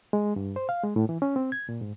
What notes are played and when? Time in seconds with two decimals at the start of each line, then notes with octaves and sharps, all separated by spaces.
0.13 G#3
0.36 G2
0.56 C5
0.69 F5
0.83 G#3
0.96 A2
1.09 E3
1.22 C#4
1.36 C4
1.52 G#6
1.69 A#2
1.81 G#2